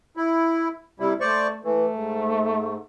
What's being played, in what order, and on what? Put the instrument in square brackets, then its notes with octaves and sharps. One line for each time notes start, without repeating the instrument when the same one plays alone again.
[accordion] E4
C3 G3 E4
[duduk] A3 [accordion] C5 D5 C#6
[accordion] E3 [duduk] A3
[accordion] G#2